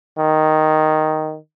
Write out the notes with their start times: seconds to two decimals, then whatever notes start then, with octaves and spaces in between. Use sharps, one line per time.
0.18 D#3